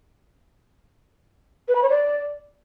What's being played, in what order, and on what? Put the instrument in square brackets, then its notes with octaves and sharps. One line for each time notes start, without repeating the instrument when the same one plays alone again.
[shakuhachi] B4
B5
C#5
D5